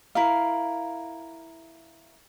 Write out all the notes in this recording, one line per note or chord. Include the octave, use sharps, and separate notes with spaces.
E4 A#4 F5